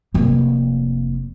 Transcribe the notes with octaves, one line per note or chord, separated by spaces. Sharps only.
F1 A#3